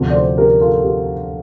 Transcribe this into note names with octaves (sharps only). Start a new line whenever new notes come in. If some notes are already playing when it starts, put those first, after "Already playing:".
Already playing: D2 C3 F3
D5
A4 C5
G4 A#4
F4 A4
G4